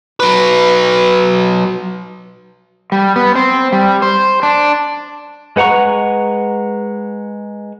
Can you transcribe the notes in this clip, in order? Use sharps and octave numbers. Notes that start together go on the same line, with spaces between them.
F#3 B4
G3
B3
C4
G3
C5
D4
G#3 B4 F#5 A#5 C#6